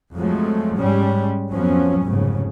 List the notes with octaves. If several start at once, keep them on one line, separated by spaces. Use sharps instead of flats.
F2 F3 F#3 G#3 A3
G#2 G3 G#3 C#4
F2 F3 F#3 B3 C#4
F1 G#2 C#3